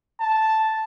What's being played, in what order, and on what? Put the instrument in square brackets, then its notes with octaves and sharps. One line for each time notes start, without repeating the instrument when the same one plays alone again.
[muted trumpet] A5